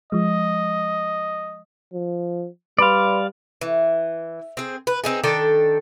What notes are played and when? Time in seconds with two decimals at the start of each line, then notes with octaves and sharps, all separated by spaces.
0.12 F3 G#3 D#5
1.94 F3
2.79 G3 B4 D5 F5 B5 C6
3.61 E3
4.57 C4 G#4
4.87 B4
5.04 C4 D#4 G#4
5.23 D#3 D4 A4 G5